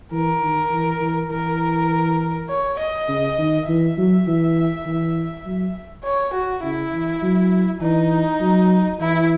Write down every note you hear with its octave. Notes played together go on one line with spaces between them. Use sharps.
E3 A#4
D#3
E3
E3
E3 A#4
C#5
D#5
C#3
D#3
E3 E5
F#3
E3
E3
F#3
C#5
F#4
C#3 E4
E3
F#3
E3 D#4
F#3
E3 E4